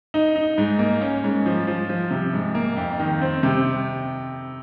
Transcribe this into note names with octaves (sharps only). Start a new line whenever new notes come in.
D#4
D#4
G#2
A#3
C#4
G#2
F3
F3
F3
C3
G#2
A#3
F2
D#3
C4
C3